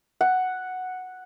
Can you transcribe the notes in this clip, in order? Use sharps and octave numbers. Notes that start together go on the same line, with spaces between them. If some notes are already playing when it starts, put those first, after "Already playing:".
F#5